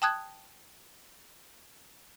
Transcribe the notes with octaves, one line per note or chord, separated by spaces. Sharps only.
G5 A5 D#6 F#6 G#6